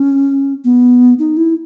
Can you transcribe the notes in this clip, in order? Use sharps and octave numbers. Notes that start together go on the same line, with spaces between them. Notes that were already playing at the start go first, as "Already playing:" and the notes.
Already playing: C#4
B3
D#4
E4